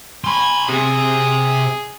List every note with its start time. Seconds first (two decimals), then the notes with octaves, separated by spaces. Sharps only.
0.24 G#5 B5 C6
0.69 C3 G#4